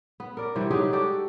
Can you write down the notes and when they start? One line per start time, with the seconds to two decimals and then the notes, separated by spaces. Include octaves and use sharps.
0.20 B3
0.37 A#4 D5
0.56 C3 E3 G3
0.71 F#3 G#3 D#4 G4
0.93 F#4 G4 A4 D5